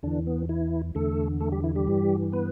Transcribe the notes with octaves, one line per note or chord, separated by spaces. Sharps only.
E2 D3 E3 D4
B3
E3 E4
E2 D3 A3 A4
A3 A4
G3 G4
E3 E4
G3 G4
G2 E3
B3 B4